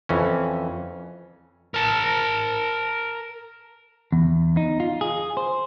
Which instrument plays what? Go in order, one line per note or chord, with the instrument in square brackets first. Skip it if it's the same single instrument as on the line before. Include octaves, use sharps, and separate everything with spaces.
[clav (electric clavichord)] F2 E3 C#4
[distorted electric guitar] A#4 A5
[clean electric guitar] E2
D#4
F4
G#4
C5